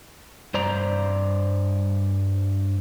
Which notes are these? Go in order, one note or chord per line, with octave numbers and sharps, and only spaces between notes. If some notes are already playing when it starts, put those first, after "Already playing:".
G2 C5 D5 A#5